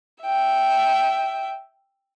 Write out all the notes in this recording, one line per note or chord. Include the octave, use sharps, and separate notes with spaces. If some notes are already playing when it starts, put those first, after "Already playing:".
E5 G5